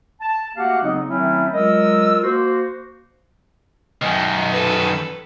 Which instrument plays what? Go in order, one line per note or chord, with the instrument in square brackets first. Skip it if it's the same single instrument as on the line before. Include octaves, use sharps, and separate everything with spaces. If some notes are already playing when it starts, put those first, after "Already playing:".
[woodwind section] A5
A3 A#3 F#4 G4 F5 F#5
C#3 F#3 B3 C4 D#4
D#3 F#3 A3 C4 C#4 E4
F#3 G#3 F4 A#4 D#5 E6
A#3 F#4 C5
[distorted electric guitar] F#2 D#3
[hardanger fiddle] A4 B4